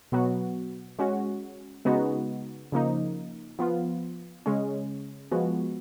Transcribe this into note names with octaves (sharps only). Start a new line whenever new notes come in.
B2 F#3 B3 F#4
G#3 C#4 F#4
C#3 G#3 B3 D#4 F#4
C#3 F3 A#3 D#4
F3 B3 F4
C#3 G#3 C#4
F3 G#3 B3 F#4